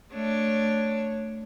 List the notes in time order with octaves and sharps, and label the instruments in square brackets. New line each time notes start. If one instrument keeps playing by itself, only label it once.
[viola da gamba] A3 D4 C#5